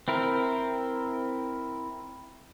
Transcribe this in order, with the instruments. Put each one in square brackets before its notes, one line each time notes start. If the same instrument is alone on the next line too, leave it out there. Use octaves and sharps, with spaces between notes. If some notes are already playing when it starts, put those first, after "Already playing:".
[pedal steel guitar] C4 E4 A#4